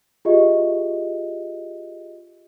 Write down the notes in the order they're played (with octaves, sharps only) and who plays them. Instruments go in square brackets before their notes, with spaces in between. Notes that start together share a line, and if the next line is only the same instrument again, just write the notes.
[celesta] F4 G4 G#4 D#5 E5